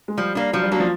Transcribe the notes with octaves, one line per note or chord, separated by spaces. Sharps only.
G#3
F3 G3
A#3 D4
F3 F#3
G3
F#3 A#3 D4
F3